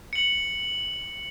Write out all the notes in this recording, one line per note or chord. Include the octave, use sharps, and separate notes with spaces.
C#7 F#7